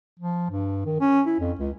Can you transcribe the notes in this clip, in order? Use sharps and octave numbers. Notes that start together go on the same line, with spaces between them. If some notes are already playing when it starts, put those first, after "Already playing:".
F3
G2
D#3
C#4
E4
F2
C#2